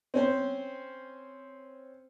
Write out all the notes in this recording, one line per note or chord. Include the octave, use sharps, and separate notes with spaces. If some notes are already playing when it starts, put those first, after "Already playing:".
C4 C#4 C5